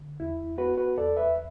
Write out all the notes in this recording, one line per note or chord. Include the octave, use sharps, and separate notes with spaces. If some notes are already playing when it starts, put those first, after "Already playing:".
Already playing: D3
E2 E4
B3 F#4 B4
F#4 B4
E2 A4 D5
B4 E5